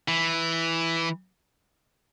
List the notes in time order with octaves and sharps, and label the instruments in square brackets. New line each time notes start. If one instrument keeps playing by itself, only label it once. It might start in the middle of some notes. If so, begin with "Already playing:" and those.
[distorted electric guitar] E3